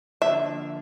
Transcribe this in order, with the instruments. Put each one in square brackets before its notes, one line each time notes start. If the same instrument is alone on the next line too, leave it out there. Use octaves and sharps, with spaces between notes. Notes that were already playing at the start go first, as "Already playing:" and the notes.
[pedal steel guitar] D3 F3 A#3 D4 [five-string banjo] E5